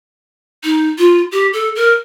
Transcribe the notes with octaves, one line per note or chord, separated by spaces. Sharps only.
D#4
F4
G4
A4
A#4